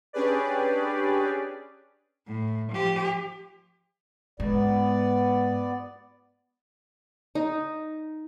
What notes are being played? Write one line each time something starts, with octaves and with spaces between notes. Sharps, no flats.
C#4 D4 G4 G#4 B4 D5
A2
F3 G4
G#2 B3 D5
D#4